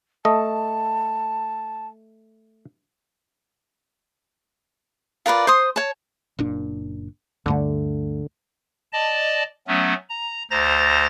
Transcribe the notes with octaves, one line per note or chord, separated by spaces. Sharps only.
A3 D#5 A5
F4 A#4 B4 D5
C5 C6 D#6
C#5 A5
F#1 A#2 D4
D2 G2 D3 A3
D5 D#5 A5
F#3 A3 B3 C#4
A#5
D2 C5 A#5 A6 A#6